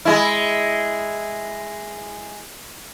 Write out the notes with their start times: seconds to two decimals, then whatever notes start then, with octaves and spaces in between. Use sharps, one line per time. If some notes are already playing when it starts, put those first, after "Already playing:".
0.05 G#3 E4